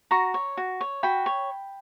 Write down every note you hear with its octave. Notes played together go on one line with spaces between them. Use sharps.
F#4 A#5 C#6
C#5
F#4
C#5
F#4 G5 B5
C#5